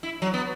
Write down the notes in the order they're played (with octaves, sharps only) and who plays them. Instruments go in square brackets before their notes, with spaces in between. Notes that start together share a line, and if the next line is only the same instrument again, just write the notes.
[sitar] E4
F#3
B3